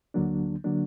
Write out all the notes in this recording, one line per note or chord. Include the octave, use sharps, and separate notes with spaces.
D2 D3 F#3 A#3 D4
D3 F#3 A#3 D4